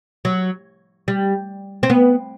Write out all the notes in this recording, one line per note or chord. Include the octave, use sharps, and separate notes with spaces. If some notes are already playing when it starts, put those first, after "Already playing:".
F#3
G3
C4
B3